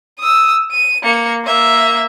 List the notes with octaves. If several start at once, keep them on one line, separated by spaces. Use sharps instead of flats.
D#6 E6
D#7
A#3 C#7
A#3 E5